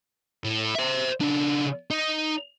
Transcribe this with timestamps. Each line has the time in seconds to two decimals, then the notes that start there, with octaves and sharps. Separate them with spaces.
0.44 A2
0.75 C5 E5
1.21 C#3 D4
1.91 D#4